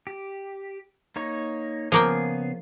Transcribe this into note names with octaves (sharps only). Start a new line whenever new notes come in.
G4
A#3 D#4 C#5
C#3 F3 A#3 B3 G#4 G5